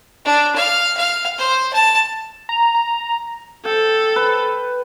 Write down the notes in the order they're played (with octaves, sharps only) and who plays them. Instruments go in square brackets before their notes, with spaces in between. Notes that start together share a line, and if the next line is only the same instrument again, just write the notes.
[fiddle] D4
F5
F5
C5
A5
[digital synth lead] A#5
A#5
[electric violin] A4 [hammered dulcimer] G5
[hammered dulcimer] B4